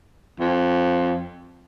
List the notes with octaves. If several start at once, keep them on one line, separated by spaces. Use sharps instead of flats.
F2